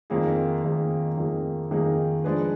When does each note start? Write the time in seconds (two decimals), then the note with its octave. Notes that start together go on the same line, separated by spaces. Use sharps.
0.10 F2 D#3 A#3 D#4 G#4
0.63 F2 D#3 A#3 D#4 G#4
1.17 F2 D#3 A#3 D#4 G#4
1.71 F2 D#3 A#3 D#4 G#4
2.24 F3 G#3 D4 G#4 B4